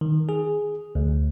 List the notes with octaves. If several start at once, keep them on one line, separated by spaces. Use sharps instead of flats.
D#3
G#4
D2